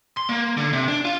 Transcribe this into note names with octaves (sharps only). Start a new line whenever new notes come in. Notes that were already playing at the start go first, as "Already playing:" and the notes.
C6
A#3
D3
C3
D4
F4